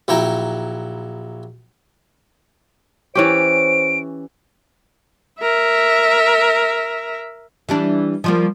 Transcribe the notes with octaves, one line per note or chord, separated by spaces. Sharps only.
A#1 F#3 E4 G5 A#5
E3 C#4 G4 C5 D7
A#4 E5
E3 G3 D4
F3 G3 A#3